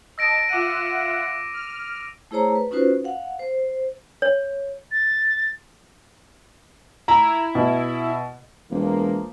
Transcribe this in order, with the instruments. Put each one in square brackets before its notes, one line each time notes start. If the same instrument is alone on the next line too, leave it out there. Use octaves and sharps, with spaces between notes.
[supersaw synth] D#5 A5 [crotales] E6 A#6 D7
[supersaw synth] F4 E5 F#5 [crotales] D6 D#7
[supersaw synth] F6
[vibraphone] A3 E4 G#4 C5 C#5 A#5
B4
C#4 D#4 F4 F#4 B4 C5
F5 F#5
C5
[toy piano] C#5
[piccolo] A6
[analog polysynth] E4 [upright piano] A#5
[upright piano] B2
[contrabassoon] E1 [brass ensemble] E3 F3 A#3